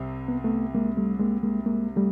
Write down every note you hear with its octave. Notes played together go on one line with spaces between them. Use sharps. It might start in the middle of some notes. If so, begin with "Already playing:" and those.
Already playing: C2 C3
B3
A3 B3
G#3 A#3
G3 A3
G#3 A#3
G#3 A#3
G#3 A#3
G3 A3